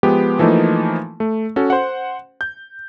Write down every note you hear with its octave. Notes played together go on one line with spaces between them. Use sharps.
F3 G#3 B3 G4
E3 F3 A3 A#3 D#4
A3
C#4 F#4 A4
C5 F#5
G6